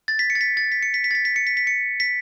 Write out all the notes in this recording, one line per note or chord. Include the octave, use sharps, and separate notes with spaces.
A6
B6
C#7
A6
B6
A6
B6
C#7
B6
B6
A6
B6
B6
C#7
B6
B6
C#7
B6